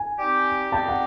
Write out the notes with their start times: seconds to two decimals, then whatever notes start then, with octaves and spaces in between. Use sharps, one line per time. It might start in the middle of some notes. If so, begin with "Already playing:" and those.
Already playing: G#5
0.19 G3 C4 D#4 G4
0.72 G3 C4 D#4 G4 A5
0.88 F#5